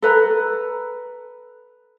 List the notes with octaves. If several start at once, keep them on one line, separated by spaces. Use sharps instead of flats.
A4 B4 A#5